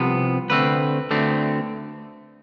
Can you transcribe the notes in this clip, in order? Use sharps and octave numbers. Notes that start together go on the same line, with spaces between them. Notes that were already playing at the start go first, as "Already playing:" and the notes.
Already playing: C2 C3 F3 B3
D2 D3 A3 C4 B4
D2 D3 A3 C4